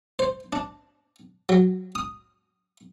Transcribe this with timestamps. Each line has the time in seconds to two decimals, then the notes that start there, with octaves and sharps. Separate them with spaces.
0.19 C5
0.53 D4
1.49 F#3
1.95 D#6